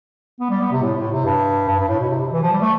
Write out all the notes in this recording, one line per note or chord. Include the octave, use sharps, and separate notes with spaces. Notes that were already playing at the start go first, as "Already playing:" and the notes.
B3
G3
B3
C3
A2
A2
C3
G2
G2
G2
A2
B2
C3
C3
E3
F3
G3
A3